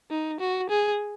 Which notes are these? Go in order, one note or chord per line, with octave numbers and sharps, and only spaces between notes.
D#4
F#4
G#4